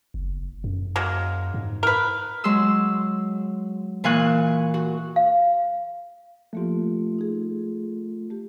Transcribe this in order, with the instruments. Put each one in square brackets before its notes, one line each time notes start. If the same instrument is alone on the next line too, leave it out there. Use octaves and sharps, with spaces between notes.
[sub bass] F#1
F#2
[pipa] F#3 G#3 A#3
[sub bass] G#2
[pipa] A#4 B4
[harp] F#3 G#3 C6 E6
A#2 E3 F5 G#5 C#6 F#6
F#4
[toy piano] F5
[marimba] F3 A#3 G4 [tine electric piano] A3 F4
[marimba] D#4 G#4
A3 G4